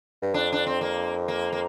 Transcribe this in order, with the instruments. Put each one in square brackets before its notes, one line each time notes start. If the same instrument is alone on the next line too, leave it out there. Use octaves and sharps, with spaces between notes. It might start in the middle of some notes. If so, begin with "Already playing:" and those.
[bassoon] G2
[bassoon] F2 [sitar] D4
[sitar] D4
C4
A#3
A#3
A#3